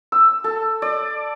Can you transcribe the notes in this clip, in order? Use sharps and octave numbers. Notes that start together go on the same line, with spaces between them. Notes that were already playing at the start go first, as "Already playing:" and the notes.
E6
A4
D5